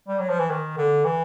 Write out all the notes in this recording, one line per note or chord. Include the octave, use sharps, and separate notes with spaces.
G3
F#3
F3
E3
D#3
D3
E3